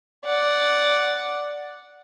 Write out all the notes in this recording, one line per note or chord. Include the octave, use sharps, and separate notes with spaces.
D5 F#5